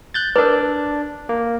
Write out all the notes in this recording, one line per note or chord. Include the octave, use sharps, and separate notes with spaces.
F#6 G6 A6
D4 A#4 B4 D5
A#3